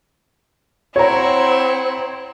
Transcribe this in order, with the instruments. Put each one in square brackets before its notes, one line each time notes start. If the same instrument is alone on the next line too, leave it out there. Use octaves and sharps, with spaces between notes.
[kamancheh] C4 [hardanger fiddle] E4 F#5 [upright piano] C#5 A#5